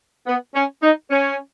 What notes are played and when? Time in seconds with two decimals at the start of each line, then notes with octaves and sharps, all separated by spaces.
0.26 B3
0.54 C#4
0.82 D#4
1.11 C#4